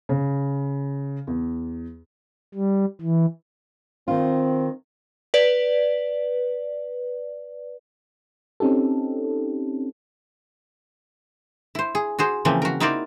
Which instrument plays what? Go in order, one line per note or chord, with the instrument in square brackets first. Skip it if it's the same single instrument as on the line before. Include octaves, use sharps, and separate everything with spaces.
[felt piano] C#3
E2
[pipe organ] G3
E3
[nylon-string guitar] D#3 F4 [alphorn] C4
[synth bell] B4 D5
[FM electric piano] C4 C#4 D#4 G4 A4
[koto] E4 C5
G#4
F#4 G#4 C5
C#3 E3 F3 A#3 C4
F#4 A#4
D#4 E4 F#4 A#4 C5 D5